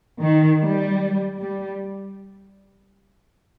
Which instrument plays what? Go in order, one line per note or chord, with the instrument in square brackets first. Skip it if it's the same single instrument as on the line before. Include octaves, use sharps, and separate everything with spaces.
[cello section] D#3
G3
G3